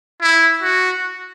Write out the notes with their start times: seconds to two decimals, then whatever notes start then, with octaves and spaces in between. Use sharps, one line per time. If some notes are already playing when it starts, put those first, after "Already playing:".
0.21 E4
0.63 F#4